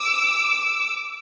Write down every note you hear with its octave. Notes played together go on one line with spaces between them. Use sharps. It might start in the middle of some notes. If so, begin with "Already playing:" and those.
Already playing: D6 E6